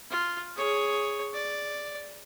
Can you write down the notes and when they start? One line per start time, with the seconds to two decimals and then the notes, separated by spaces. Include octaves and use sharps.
0.10 F4
0.56 G#4 C#5
1.34 D5